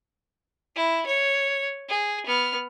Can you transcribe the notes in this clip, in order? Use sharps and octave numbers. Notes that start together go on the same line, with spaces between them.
E4
C#5
G#4
B3 F6